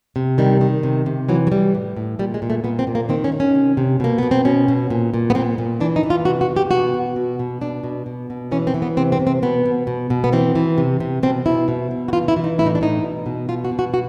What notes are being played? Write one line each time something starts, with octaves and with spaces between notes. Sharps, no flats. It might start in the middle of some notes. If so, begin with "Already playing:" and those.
C3
D#3 G3
D#3
C3
C3
E3 F#3
F#3
E3 G3
A2
A2
A#2 G3
G#3
A#2
A3
A#2 B3
C4
A#2
A#3
D#3 C4
C#4
D#3
C#4
C3
C3
B2 A#3
B2 B3
C4
B2 C#4
B2
A#2
A#2
B3
A#2 C4
A#2
E3 D4
D#4
E3
F4
C3 F#4
F#4
C3
G4
B2 F#4
B2
B2
B2
B2 D4
B2
B2
B2
E3 C#4
C4
E3
B3
C3 C4
C4
C3
C4
B2 B3
B2
B2
B2
B3
E3 C4
E3
C3
C3
B2 C4
B2 E4
B2
B2
F#4
E3 F4
E4
E3
D#4
A2 E4
D#4
D4
A2 D#4
B2
B2
B2 F4
F#4
B2
F#4
F#4